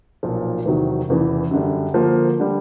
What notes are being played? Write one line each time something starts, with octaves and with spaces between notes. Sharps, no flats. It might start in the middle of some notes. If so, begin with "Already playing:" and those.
B1 A#2 F3
E2 C3 D#3 F#3
F1 E2 C#3 E3
F#2 D3 G3
D2 D3 F3 A#3
D3 G3